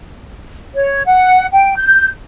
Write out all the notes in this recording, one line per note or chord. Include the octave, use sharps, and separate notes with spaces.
C#5
F#5
G5
G6